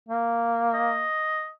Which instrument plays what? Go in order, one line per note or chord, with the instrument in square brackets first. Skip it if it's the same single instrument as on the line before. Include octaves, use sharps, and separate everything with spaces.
[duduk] A#3
[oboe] D#5